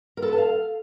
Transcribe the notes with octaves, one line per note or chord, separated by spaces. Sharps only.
A#4
A4
B4
A5
F5